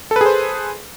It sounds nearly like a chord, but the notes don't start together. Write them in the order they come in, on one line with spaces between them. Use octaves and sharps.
A4 B4 G#4 C5